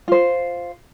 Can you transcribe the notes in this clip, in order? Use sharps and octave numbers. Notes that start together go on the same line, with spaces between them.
F4 C5